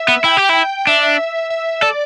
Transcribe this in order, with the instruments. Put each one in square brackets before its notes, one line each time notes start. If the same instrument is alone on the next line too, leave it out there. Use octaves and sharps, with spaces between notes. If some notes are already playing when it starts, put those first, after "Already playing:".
Already playing: [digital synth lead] E5
[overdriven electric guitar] B3
[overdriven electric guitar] E4 [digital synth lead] G5
[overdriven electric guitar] G4
E4
[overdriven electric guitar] D4 [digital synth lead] E5
[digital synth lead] E5
[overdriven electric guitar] A4 [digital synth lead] D5